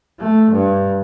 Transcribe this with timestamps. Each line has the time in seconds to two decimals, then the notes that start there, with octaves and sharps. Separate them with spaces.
0.19 A3
0.51 G2